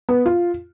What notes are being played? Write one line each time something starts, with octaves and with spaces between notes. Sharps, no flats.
B3
F4